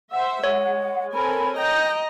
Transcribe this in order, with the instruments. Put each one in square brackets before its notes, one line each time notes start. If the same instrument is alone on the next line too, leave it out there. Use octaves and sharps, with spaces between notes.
[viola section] C5 E5 [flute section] F#5
[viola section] G#3 [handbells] C#5
[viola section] C4 A#4 G#5 [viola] A4 [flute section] B5
[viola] D#5 A#5 [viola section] G5 [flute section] G6